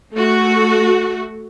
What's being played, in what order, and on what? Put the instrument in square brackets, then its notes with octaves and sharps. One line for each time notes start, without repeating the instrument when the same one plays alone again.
[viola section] A3 F#4